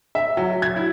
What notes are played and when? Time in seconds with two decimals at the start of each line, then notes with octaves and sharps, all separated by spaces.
0.15 E5
0.37 F#3
0.62 G#6
0.76 E4